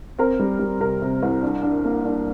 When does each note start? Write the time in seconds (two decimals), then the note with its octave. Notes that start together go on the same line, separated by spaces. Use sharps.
0.19 C4 A#4
0.40 G3
0.60 G3
0.80 C3 A#4
1.02 C3
1.23 C2
1.43 D4
1.63 D4
1.85 A#3
2.05 D4